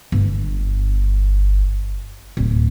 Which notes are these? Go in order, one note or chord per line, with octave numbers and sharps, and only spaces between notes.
G1
D1